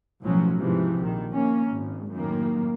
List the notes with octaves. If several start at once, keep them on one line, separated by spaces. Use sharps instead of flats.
B1 A2 F3 F#3 C#4
G#2 C3 E3 F3
A#1 D#3
A#3 C#4
G#1
F#2 A2 D#3 A#3